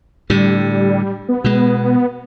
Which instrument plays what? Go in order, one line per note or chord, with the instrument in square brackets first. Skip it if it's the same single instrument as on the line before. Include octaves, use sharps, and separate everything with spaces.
[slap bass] A2 D3 [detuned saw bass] G3
[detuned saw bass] B3
[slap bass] B2 G#3